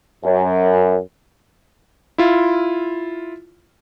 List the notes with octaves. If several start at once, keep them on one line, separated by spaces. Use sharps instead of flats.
F#2
E4 F4